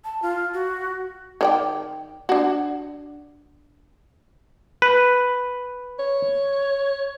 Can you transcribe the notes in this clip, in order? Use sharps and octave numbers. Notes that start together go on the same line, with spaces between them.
A5
F4
F#4
D#3 D5 G5
D4 F#4
B4
C#5